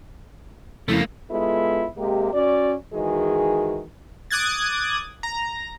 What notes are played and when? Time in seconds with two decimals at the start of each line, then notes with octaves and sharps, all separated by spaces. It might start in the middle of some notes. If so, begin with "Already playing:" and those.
0.88 F2 C#3 A3 A#3 E4
1.30 G#3 B3 E4 F4 A4
1.98 C3 G#3 A#3 G4
2.33 C#4 F#4 D5
2.93 D#3 E3 G#3 F#4 G#4
4.31 D6 D#6 F#6 G#6 A6
5.23 A#5